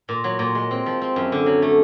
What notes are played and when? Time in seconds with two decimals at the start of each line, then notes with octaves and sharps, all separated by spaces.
0.09 A#2
0.24 F#3
0.39 A#2
0.55 G#3
0.71 C4
0.86 F3
1.01 C4
1.16 F#2
1.32 D3
1.46 F#3
1.62 A3